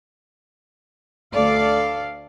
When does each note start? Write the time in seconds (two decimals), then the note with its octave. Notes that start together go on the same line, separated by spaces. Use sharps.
1.33 D2 A4 D5 F5